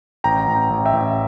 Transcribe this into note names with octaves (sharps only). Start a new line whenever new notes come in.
A1 G5 A#5
A1
G5 A#5
A1
E5 G5
A1